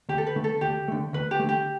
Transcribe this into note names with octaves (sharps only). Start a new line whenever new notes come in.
D2 G4
A4
B4
D3 A3
A4
D2 G4
D3 A3
D2 B4
G4
D3 A3
G4